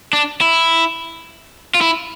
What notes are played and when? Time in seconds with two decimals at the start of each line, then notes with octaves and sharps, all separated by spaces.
0.13 D4
0.41 E4
1.74 F4
1.81 E4